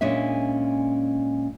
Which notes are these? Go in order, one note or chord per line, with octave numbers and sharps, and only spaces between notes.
A#2 G#3 C#4 D4 E5